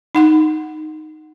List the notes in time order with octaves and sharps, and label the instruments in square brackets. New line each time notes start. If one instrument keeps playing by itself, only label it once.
[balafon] D#4 F#5 C6